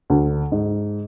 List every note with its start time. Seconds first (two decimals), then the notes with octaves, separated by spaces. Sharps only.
0.10 D2
0.52 G#2